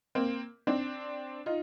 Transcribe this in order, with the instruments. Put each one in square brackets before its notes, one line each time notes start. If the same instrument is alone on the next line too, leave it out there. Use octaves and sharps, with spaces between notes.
[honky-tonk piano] A#3 C4
C4 D4
D#4 F4